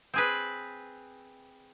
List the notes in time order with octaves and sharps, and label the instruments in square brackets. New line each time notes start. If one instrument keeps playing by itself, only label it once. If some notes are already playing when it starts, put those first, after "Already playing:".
[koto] C4 G#4 B4